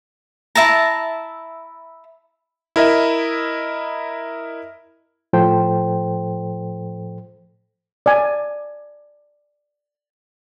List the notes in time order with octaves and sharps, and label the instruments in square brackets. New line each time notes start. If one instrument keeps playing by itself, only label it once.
[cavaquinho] E4 E5 A5 A#5
[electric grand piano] E4 A#4 D#5 E5
[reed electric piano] A2 F3 A4 C5 G5
[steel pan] D5 G#5